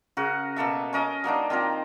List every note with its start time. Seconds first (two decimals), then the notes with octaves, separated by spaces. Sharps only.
0.17 C#3 F#4 A#4 F#5
0.56 B2 A#3 A4 E5
0.93 C#4 A#4 D#5 A5
1.24 F#3 A#3 D4 D#4
1.50 D#3 C4 F4 A#4